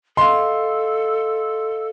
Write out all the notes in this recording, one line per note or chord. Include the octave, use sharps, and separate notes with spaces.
A4 D#5 F5 C6